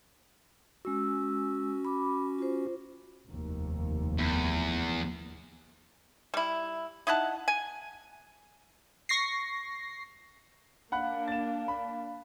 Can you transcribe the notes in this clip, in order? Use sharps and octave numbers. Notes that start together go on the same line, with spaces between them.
G#3 C#4 F#4 E6
B5 D6
F4 C5
F1 D#2
E2
G3 E4
D#4 E4 F#5 A5
G#5
C#6 A#6 C7
A#3 D4 F5 F#5 B5 F#6
A6 E7
B5